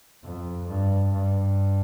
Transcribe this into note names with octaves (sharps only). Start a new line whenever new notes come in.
F2
G2
G2